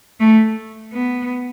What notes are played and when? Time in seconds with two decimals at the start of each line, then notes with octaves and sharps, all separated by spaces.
0.20 A3
0.94 B3